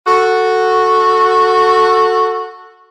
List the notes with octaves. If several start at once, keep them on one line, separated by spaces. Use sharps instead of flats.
F#4 A4